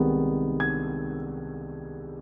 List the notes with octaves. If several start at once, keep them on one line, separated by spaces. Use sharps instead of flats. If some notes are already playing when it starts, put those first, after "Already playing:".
Already playing: C2 C3 D#3 G#3 B3
G#6